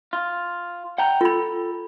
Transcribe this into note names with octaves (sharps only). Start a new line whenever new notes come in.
F4
F#5 G5 A#5
F4 A4 B5